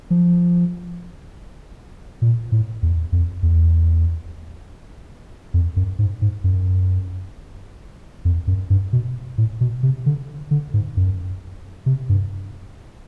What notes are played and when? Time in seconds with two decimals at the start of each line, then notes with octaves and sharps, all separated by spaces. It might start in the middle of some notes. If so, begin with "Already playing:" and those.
0.10 F3
2.22 A#2
2.52 A2
2.82 E2
3.12 F2
3.43 E2
5.54 F2
5.76 F#2
5.99 G#2
6.22 G#2
6.44 F#2
8.25 F2
8.47 F#2
8.70 G2
8.93 B2
9.38 A2
9.61 B2
9.83 C3
10.06 D3
10.51 D3
10.74 G#2
10.97 F#2
11.86 C3
12.09 G2